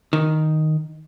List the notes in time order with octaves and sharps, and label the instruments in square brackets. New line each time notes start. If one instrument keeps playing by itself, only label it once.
[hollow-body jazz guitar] D#3